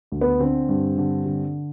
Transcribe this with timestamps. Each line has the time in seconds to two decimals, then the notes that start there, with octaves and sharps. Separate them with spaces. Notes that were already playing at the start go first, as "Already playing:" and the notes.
0.12 D2
0.21 B3
0.40 D3 C4
0.69 G2
0.98 D3
1.26 D3